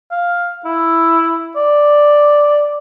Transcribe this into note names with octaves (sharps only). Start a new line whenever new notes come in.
F5
E4
D5